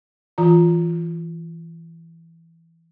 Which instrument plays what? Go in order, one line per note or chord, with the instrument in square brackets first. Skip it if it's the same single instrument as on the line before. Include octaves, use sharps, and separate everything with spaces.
[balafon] E3 F4 A#5